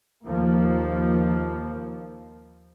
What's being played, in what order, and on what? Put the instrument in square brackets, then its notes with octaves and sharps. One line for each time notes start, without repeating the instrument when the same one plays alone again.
[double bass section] D#2 F3 A#3